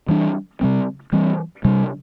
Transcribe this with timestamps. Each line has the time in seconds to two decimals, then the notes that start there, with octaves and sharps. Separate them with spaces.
0.09 E3 G3 D4
0.61 C3 G3 C4
1.12 E3 G3 C4
1.65 C3 G3 D4